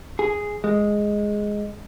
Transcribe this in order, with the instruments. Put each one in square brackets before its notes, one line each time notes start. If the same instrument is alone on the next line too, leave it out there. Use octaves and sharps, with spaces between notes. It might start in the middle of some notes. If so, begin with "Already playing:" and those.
[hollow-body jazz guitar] G#4
G#3